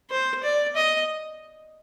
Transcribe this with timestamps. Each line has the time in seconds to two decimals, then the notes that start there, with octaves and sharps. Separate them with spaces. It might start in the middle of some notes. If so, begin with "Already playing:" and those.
0.10 C5
0.44 D5
0.76 D#5